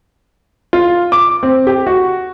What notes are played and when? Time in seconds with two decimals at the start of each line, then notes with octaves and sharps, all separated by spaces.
0.73 F4
1.12 D6
1.43 C4
1.67 G4
1.87 F#4